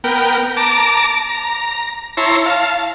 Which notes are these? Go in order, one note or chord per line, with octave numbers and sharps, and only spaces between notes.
B3 A#4 G5
A5 A#5 D6
A#5
E4 C#5 A5 A#5 C6
F5 A5